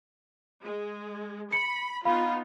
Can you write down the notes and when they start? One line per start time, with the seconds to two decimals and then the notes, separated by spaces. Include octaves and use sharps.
0.63 G#3
1.52 B5 C#7
2.05 B3 D#4 F4 F5 B5